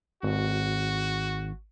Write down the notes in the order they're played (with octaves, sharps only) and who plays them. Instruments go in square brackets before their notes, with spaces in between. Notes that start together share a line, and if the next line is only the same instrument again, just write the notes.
[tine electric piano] G#1 [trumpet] F#4